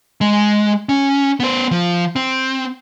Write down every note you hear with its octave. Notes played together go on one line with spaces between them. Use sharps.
G#3
C#4
B3 C5
F3
C4